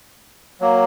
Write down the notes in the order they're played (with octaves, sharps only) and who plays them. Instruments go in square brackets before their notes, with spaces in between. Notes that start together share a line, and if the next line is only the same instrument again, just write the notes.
[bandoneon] F#3 A#3